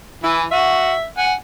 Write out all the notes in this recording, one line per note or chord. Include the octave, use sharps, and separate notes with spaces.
E3 E4 G#5
F#4 E5
F#5 G#5